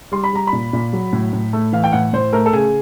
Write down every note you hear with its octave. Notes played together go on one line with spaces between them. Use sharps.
G3 C6
B5
G3 A#5
B5
A#2
A#2
F#3
A2
A2
A3
E3 F5
G5
A2 F#5
A2 C5
A3 A#4
A4
C#3 G#4